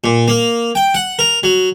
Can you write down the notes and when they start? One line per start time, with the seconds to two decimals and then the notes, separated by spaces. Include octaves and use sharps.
0.04 A#2
0.28 A#3
0.75 G5
0.94 F#5
1.19 A#4
1.43 F#3